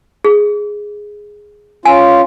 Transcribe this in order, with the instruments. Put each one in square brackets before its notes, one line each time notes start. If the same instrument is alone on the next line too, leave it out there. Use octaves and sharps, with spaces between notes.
[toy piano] G#4
[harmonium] C#4 F4 [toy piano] G#5